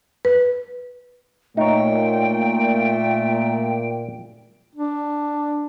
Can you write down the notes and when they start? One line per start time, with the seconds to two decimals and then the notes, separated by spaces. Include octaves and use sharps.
0.25 B4
1.57 A#2 A3 D#4 C#5 G5
4.75 D4